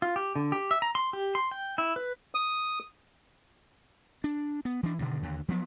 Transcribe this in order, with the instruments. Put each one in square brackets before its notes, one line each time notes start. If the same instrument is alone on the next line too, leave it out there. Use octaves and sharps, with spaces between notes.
[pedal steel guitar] F4
G4
D3
G4
E5
A#5
C6
G4
C6
G5
E4
B4
[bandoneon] D#6
[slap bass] D4
B3
E3 D4
G2 B2 D3 D#3
D#2 D3
F3 F#3 A#3 B3